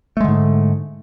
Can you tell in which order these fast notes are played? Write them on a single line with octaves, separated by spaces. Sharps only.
A3 G#3 D3 G#2